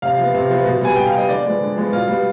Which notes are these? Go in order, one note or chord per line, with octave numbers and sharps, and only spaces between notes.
C3 F5
F3 B3
C3
F3 B3
B2
G3 B3 G#5
B2 G5
F5
G3 B3 D#5
D3 D5
F3 G#3 B3
D3
F3 G#3 B3
B2 F4
G3 B3